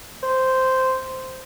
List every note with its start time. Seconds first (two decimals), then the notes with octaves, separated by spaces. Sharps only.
0.23 C5